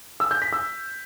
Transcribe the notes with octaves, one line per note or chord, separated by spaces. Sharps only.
E6
G6
B6
E6